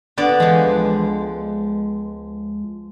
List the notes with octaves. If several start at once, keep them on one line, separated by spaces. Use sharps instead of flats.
G1 D3 B3 D5
E3 F3 G#3
C#2